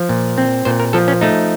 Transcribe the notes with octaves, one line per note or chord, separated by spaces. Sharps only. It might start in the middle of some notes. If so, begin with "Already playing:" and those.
Already playing: F3
A#2
C4
A#2 C5
A#4
F3 A4
C#4
A3 D#4